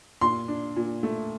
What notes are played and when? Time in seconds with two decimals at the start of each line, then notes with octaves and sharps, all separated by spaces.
0.21 A#2 C6
0.48 D4
0.76 A#2
1.03 A3